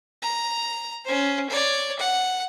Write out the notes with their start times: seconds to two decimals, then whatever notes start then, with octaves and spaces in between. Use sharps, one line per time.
0.22 A#5
1.05 C#4 C5
1.50 C#5 D5
1.99 F#5